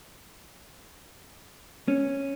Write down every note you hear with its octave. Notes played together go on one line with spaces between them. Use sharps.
C#4